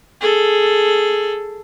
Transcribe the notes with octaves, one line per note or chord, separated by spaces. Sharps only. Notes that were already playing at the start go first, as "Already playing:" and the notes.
G#4 A4